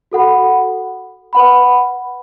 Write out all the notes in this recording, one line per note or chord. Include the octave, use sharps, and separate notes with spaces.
F#4 A4 F#5 B5
B4 F#5 B5